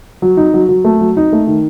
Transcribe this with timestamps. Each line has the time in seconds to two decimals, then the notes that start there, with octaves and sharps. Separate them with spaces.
0.22 F#3
0.37 D#4
0.54 F#3
0.69 F#3
0.85 A3
1.01 F#3
1.17 D#4
1.33 A3
1.47 D#3